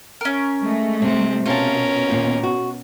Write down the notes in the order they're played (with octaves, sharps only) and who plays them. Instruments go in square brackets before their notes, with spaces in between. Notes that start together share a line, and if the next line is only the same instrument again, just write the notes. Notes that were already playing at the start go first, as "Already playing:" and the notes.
[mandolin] C#4 A#4
[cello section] G#3 A3
[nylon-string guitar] C3 [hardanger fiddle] C4
[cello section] B2 [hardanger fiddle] C#4 A#4 [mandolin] F4 A5
[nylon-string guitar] D#2 A#2
F#4